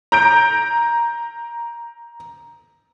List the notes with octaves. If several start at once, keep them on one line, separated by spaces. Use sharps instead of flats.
A#5 G6 D7